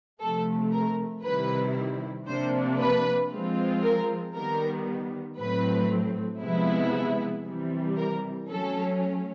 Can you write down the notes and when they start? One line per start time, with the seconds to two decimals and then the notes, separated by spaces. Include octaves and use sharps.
0.21 C3 F3 A3 A4
0.73 A#4
1.24 C3 D#3 G3 C4 E4 B4
2.28 C3 F3 A#3 D4 C5
2.80 B4
3.31 F3 G#3 C4 F4
3.84 A#4
4.35 D#3 G3 B3 A#4
5.38 A2 F#3 A3 C4 B4
6.43 C3 F3 G#3 B3 E4
7.46 C3 E3 G3
7.98 A#4
8.49 F#3 A3 C#4 A4